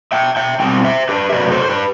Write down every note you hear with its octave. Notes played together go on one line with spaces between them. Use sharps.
E5 G5
E5 G5
B2 G3 C4 G5
C5 E5
G4 B4
E5
C3 F#3 A3 B4 D5
A4 C5
C5
G4 B4